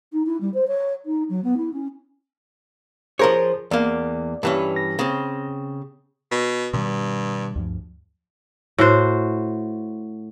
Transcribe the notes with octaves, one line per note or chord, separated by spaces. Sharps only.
D#4
E4
G3
C5
C#5
D#4
F#3
B3
E4
C#4
F3 G#4 A#4 C5 C#5
E2 A#3 D5
G2 E3 C#4
A#6
C#3 C4
B2
G2 B2 D#3 G3
D2 G2 F3
A2 F#4 C5